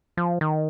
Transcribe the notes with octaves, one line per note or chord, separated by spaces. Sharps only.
F3
D#3